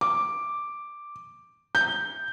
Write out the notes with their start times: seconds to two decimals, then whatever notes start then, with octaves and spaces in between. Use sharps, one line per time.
0.01 D6
1.75 G6